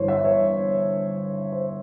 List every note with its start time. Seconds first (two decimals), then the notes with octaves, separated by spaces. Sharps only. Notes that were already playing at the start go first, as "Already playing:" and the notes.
Already playing: G1 G2 E3 C5 C#5
0.08 E5
0.25 C#5
1.52 C5